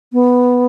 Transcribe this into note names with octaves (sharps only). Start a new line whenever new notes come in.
B3